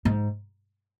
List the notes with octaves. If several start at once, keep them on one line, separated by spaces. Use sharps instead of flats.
G#2